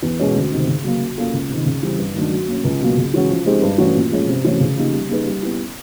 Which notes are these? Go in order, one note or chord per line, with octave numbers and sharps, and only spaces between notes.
E2
B2 G#3 C#4 F#4
D2
C3 D#3
C#3
F#3 A#3
F#3
A#3 C#4 F4 A4
C#2
C3 D#3
C#3
E3 G3 C4 E4
G2
D#3 F#3 A3 D4
F#3
A#3 C#4
C#2
B2 F#3 A#3
C#3
E3 G#3 C#4 F#4
F3
G#3 C4 D#4 G4
G2
E3 A3 C#4 F#4
A#2
F3 G#3 C#4
C3
E3 A3 C#4 F#4
C#3
F3 A#3 D#4 G4
G3
A#3 D#4 G#4 B4
G3
B3 E4